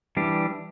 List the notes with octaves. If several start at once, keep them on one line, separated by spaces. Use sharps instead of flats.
E3 G3 D4 G4